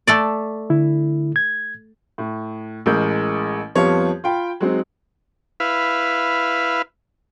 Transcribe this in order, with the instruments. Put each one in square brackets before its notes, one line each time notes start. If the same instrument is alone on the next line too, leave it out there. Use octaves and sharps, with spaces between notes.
[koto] A3 A4 D5
[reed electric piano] D3 E4
G#6
[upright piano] A2
A1 G#3 A#4 G6
F2 F3 G3 B3 F4 C#5
F4 G5 B5
F#3 G#3 C4 D#4
[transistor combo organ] E4 B4 F5